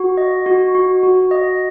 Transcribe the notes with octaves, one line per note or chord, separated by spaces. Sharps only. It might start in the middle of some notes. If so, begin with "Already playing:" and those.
Already playing: F#4
D#5
F#4
F#4
F#4
D#5